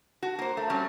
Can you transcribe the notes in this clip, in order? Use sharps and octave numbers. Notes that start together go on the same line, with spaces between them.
F#4
A#3 C5
A3
F#3 G3 C4 C#4